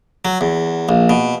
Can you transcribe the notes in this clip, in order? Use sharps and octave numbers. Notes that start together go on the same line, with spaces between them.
F#3
E2
A#1
B2